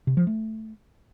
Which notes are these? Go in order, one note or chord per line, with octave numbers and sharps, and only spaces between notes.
C3
F3
A3